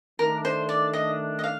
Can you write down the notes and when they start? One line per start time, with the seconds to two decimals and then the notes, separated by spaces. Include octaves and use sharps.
0.19 D#3 A3 D4 A#4
0.45 C5
0.69 D5
0.93 D#5
1.39 D#5
1.44 F5